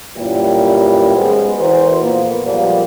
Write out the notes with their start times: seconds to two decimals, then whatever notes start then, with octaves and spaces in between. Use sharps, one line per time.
0.16 F#2 A#2 E3 G3
1.15 B1 G#3 B3 C#4 G#4 C5
1.59 E2 E3 F#4 A#4 C5
2.01 F2 A#2 A#3 B3
2.44 A#2 F3 G3 G#3 A#3 B3